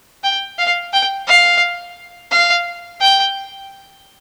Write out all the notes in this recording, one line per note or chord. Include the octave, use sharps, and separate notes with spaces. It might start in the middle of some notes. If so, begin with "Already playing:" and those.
G5
F5
G5
F5
F5
G5